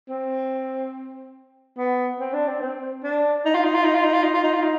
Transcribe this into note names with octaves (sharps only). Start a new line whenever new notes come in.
C4
B3
C4
D4
C4
C4
D4
D#4
F4
D#4
F4
D#4
F4
D#4
F4
D#4
F4
D#4
F4
D#4